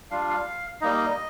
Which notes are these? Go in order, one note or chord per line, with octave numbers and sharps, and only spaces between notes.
G3 D4 F4 F5
F5
G3 A#3 D#4 D#5